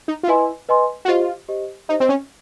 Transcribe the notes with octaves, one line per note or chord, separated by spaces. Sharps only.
D#4
F4
E4 B4 D#5 G#5 C6
B4 D#5 G#5 C6
F#4
F4 G4 C5 D#5
G4 C5 D#5
D#4 G4 C5 D#5
C4
C#4